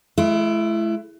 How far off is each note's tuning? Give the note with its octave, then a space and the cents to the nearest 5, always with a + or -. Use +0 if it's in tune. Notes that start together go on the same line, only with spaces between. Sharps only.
A3 -45 E4 +25